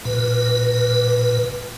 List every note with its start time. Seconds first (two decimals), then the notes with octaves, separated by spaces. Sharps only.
0.05 A#2 B4